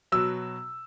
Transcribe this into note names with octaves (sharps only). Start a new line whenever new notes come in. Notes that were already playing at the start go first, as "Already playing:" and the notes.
B2 F#3 E6